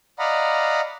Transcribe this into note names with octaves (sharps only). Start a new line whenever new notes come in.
D5 D#5 F5 F#5 A#5 B5